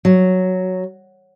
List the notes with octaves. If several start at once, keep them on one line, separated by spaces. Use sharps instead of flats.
F#3